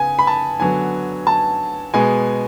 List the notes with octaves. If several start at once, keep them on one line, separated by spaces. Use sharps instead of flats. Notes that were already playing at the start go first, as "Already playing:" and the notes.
Already playing: C#3 B3 G#5
B5
A5
D3 F#3 B3 G#5
A5
B2 G#3 B3 G#5